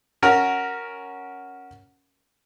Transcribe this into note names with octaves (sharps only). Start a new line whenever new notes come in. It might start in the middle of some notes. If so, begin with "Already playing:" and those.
C#4 F#4 A#4